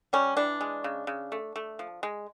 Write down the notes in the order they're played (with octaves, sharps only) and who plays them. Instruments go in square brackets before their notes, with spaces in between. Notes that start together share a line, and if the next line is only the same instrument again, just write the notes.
[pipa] G3 C#4
E3 D4
G#3
C#3
C#3
A3
A3
F3
G#3